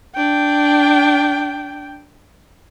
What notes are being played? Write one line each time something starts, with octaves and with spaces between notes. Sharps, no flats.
D4 G5